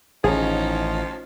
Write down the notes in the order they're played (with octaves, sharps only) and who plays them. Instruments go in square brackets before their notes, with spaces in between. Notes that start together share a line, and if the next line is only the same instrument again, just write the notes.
[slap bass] A1 D#3 [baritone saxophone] F3 [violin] C#4 D#4 [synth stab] G#4